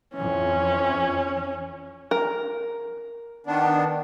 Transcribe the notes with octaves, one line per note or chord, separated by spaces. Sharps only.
F2 E3 C#4
A#4
D#3 B3 D4